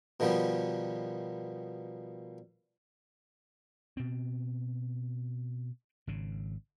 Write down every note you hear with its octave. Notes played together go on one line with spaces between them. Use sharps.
B2 D#3 F3 G3 B3
B2 C4
G#1 C#3